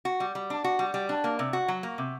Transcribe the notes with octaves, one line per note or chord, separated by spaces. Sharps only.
F#4
G3
G3
D4
F#4
G3
G3
D4
A#3
C3
F#4
F#3
A#3
C3